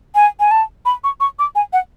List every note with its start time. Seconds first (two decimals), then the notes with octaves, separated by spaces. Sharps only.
0.15 G#5
0.40 G#5
0.51 A5
0.85 B5
1.04 C#6
1.20 C#6
1.39 D6
1.55 G#5
1.73 F#5